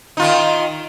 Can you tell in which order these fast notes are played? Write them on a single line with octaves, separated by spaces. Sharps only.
D#4 F4 D#3